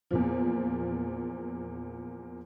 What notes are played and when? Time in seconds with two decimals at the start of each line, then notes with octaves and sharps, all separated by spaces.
0.11 E2 A#2 F3